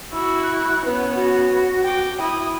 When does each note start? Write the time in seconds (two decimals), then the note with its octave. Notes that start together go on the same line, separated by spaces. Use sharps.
0.12 E4 F#4 E6
0.43 F#6
0.85 B3 C#4 B4
1.16 F#4
1.84 G5 D6
2.20 E4 D#6